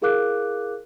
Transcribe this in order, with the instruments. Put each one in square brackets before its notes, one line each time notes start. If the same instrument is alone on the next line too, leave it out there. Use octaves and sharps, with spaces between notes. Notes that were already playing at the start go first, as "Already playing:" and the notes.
[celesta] E4 G#4 A#4 F5 D6 F#6